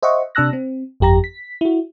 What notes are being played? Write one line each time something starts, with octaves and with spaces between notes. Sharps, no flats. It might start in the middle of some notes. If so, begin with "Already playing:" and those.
C5 D#5 E5 F#5 C#6
C3 D4 A5 E6 F#6 A#6
C4
G1 F2 G4 A#5 A#6
B6
E4 F#4